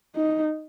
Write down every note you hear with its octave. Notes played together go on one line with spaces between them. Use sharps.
D#4